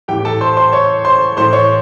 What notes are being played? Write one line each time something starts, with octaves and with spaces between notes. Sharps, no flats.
A2 E3 G4 G5
A4 A5
C5 C6
C5 C6
C#5 C#6
C5 C6
A2 E3 C5 C6
C#5 C#6